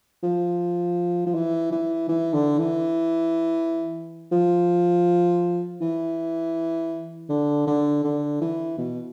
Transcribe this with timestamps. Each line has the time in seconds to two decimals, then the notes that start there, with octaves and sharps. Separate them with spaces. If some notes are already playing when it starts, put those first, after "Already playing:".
0.23 F3
1.26 F3
1.35 E3
1.72 E3
2.09 E3
2.33 D3
2.58 E3
4.31 F3
5.81 E3
7.29 D3
7.67 D3
8.04 D3
8.41 E3
8.78 B2